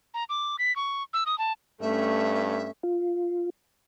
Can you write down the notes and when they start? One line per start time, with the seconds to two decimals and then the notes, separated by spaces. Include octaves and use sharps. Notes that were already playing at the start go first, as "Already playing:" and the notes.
0.14 A#5
0.29 D6
0.59 B6
0.76 C#6
1.13 E6
1.26 D#6
1.38 A5
1.81 G2 A3 C#4 E5
2.83 F4